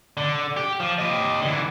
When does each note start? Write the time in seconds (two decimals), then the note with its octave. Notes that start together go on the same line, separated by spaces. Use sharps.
0.17 D3
0.57 G4
0.80 F3
0.99 G4 D#5
1.42 D3 E3